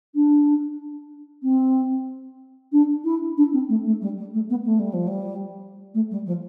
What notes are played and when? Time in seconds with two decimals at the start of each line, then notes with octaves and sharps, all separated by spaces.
0.15 D4
1.43 C4
2.72 D4
3.04 E4
3.37 D4
3.53 C4
3.69 A3
3.86 A3
4.01 G3
4.17 G3
4.33 A3
4.50 B3
4.65 A3
4.79 G3
4.93 F3
5.07 G3
5.94 A3
6.11 G3
6.26 F3